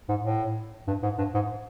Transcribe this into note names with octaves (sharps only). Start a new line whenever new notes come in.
G#2
A2
G2
G#2
G2
G#2